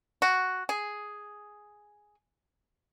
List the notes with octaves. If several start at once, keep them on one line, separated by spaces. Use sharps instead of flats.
F#4
G#4